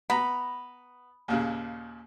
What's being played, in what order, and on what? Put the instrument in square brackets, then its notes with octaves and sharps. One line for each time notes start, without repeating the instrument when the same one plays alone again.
[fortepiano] B3 A#5 [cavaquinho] B5
[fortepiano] D#2 A#2 C#3